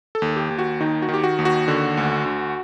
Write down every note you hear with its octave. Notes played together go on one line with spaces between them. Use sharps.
A4
D#2
G4
D#2
F#4
D#3 D#4
F#4
D#3
G4
F#4
D#2
F#4
D3
D2
D2